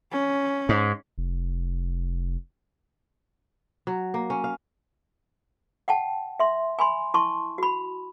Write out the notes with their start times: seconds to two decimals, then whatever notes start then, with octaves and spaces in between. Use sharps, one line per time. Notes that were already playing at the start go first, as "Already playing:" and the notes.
0.11 C#4
0.69 G#2
1.18 F1
3.87 F#3
4.14 A#3
4.30 C#4
4.44 F5
5.88 F#5 G5 A5
6.40 E5 C6
6.79 G#5 B5 C6
7.14 E4 A5 C6 C#6
7.58 F#4 B5